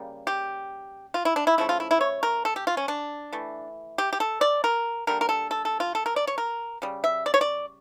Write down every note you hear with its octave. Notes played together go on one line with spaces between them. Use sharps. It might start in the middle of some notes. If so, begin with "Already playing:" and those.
Already playing: C#3 G3 A#3
G4
F4
E4
D4
E4
C#3 F3 A3 E4
F4
E4
E4
C#5
A#4
A4
G4
F4
C#4
D4
E3 A3
G4
G4
A4
D5
A#4
D3 G3 A#3 A#4
A#4
A4
A4
A4
F4
A4
A#4
D5
C#5
A#4
C#3 G3
E5
D5
C#5
D5